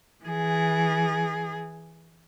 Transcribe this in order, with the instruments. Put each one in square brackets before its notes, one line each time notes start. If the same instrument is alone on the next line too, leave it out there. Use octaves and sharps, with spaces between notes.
[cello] E3 G#4